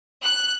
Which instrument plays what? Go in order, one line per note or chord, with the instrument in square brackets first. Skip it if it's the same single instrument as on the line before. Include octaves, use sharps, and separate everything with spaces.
[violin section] F#6